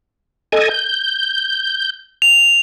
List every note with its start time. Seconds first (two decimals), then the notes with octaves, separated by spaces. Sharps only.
0.52 A4 D#5 G#5
0.70 G6
2.22 F7